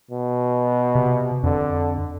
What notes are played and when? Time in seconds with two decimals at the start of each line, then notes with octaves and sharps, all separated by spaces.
0.10 B2
0.95 C3
1.43 F2 D3